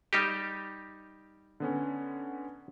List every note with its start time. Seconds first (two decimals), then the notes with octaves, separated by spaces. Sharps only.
0.13 G3 D#4 G4
1.60 D3 B3 C#4